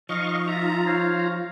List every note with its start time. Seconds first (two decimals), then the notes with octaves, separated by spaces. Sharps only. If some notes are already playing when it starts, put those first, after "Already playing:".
0.09 F3 D#4 D#5 F5 C#6
0.48 F4 E5 A#5
0.87 C5 C#5 F5